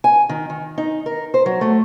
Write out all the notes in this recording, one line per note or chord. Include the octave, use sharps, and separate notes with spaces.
G#5
D#3
D#3
D#4
A#4
C5
F#3
A3